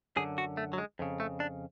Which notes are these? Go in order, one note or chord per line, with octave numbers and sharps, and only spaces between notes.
F#2 D3 G#4
F#4
A3
F#3
G#3
F2 C#3
A3
D4